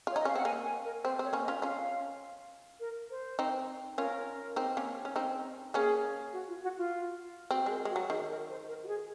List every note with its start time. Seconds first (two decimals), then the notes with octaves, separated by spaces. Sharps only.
0.07 F4
0.11 C#5
0.16 D#4 D#5
0.25 C#4 F5
0.35 C4 F#5
0.45 A#3 G#5
0.64 G#5
0.84 A#4
1.04 C4 C5
1.19 C4 C#5
1.33 A#3 C#4
1.43 D#5
1.48 C#4 F4
1.62 C#4 F4 F5
2.80 A#4
3.10 C5
3.39 C4 D#4
3.98 C#4 F4 A#4
4.56 C4 D#4
4.77 A#3 C#4
5.05 C#4
5.16 C4 D#4
5.74 A#3 C#4 G#4
6.33 F#4
6.48 F4
6.63 F#4
6.78 F4
7.51 C4 F#4
7.66 G#3 A#4
7.85 G#3 F#4
7.96 F#3
8.10 D#3 G#4
8.30 A#4
8.50 C5
8.68 A#4
8.84 F#4
8.88 G#4